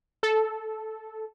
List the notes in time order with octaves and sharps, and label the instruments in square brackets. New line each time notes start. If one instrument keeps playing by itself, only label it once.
[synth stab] A4